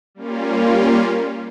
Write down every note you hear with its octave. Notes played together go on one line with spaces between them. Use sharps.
G3 A#3 C#4 F4